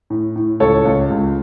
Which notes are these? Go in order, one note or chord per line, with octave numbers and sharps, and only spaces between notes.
A2
A2
C#2 A4 C#5
C#2
C#2